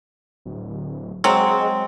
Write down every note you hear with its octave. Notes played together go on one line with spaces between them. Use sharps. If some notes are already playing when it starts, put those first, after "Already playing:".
D1
F#3 G#3 C4